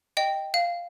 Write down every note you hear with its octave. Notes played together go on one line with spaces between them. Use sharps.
D#5 G5
F5